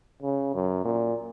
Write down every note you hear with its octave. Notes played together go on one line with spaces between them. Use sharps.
C#3
F#2
A#2